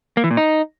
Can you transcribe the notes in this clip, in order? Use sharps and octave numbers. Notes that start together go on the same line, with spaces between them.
A#3
E3
A#2
D#4